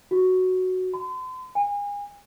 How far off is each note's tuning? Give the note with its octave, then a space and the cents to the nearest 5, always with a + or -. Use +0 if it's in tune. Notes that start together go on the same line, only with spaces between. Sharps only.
F#4 +0
C6 -40
G#5 -35